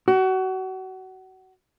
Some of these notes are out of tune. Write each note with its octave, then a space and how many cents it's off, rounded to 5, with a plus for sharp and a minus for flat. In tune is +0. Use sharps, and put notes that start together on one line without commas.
F#4 +30